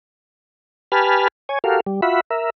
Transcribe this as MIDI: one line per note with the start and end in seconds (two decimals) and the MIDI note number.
0.92 1.28 67
0.92 1.28 71
0.92 1.28 80
0.92 1.28 81
0.92 1.28 83
0.92 1.28 89
1.49 1.59 73
1.49 1.59 80
1.64 1.80 66
1.64 1.80 67
1.64 1.80 69
1.64 1.80 70
1.64 1.80 77
1.87 2.01 55
2.02 2.21 65
2.02 2.21 66
2.02 2.21 76
2.02 2.21 83
2.31 2.50 70
2.31 2.50 76